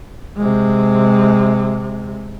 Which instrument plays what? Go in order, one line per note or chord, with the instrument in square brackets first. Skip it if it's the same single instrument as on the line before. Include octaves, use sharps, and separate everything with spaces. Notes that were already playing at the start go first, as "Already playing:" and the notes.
[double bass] C3 G#3